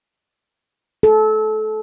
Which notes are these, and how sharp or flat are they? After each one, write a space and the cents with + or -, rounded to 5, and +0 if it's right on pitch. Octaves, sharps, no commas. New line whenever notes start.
A4 -25